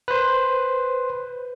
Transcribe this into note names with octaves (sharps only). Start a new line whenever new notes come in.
B4 C5